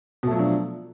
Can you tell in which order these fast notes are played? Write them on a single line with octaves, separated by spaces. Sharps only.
B2 A3 F#3 F3 D4